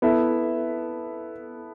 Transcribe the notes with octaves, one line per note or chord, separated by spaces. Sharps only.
B3 E4 A4 E5